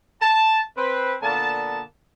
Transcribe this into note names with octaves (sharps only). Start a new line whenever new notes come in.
A5
C4 B4
A#2 D3 A#3 B3 A5